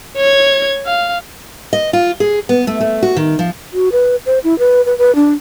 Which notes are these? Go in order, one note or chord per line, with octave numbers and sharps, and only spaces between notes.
C#5 G#6
F5
D#5
F4
G#4
B3
A3
A3
F#4
D#3
F3
F#4
B4
C5
E4
B4
B4
B4
D4